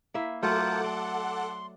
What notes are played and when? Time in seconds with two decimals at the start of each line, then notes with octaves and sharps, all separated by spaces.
0.14 A#3 E4 E5
0.43 F#3 A3 F4 A4 A#4 C5 F#5 D6
0.84 D5 C6